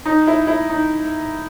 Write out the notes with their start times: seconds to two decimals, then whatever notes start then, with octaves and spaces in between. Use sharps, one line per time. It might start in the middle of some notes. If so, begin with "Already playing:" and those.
0.06 D#4
0.27 E4
0.47 E4
0.69 D#4